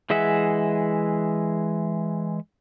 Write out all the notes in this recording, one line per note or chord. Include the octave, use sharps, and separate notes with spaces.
E3 G#3 G#4 E5 F#5